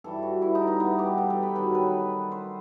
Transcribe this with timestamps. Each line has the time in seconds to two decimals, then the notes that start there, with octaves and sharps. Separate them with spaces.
0.04 G2 E3 G3 A4
0.23 F#4
0.42 E4
0.55 D#4
0.67 D#4
0.80 B3
0.99 G4
1.18 A4
1.30 A4
1.43 B4
1.56 G2 D#3 F#3 B4
1.75 B4
2.32 C5